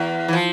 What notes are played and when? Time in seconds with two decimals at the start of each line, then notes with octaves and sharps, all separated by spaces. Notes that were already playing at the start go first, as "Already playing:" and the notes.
Already playing: E2
0.28 E3
0.33 F3